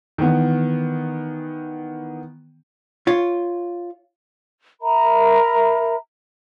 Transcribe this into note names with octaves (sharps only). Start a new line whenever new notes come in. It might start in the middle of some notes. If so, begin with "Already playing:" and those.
D#3 E3 B3
F4 C#5
A#4 E5 A#5 B5